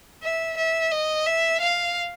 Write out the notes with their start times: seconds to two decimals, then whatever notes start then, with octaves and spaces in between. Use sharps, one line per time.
0.23 E5
0.57 E5
0.91 D#5
1.27 E5
1.61 F5